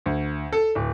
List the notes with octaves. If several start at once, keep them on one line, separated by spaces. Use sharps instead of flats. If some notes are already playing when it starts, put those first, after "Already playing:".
D2
A4
D1